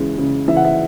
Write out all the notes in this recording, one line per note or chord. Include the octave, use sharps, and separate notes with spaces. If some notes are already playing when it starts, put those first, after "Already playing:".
Already playing: C#3 E3 G#3
C#3
E3 E5
F#5
E5